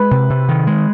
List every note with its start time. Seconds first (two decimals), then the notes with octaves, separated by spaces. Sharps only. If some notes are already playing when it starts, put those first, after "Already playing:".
Already playing: G#3 B4
0.11 C3
0.30 C3
0.49 D#3
0.67 G#3